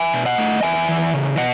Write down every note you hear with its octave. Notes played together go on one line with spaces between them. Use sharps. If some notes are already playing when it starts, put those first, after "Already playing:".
Already playing: E5 G#5
B2
D#5 F#5
A3
E2 E5 G#5
E3
C#3
B2 D#5 F#5